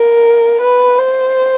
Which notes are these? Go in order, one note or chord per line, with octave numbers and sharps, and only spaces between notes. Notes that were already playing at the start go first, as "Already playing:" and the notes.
Already playing: A#4
B4
C5